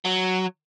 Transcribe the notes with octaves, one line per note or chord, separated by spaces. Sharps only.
F#3